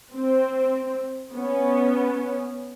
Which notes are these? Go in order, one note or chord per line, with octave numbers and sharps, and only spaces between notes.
C4
B3 C#4